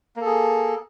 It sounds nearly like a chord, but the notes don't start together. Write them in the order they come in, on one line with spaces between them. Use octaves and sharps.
A#3 A4 G#4